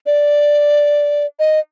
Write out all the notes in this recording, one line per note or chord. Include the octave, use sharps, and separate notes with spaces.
D5
D#5